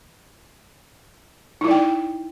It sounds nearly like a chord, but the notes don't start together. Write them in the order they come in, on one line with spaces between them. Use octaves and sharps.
D#4 E4 D5 G5